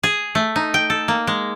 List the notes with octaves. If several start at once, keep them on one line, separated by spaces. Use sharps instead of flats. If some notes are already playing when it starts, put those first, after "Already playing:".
G#4
A3
D#4
G5
A4
A#3
G#3